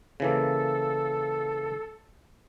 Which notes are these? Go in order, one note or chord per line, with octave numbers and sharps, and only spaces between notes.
C#3 E3 A#3 A4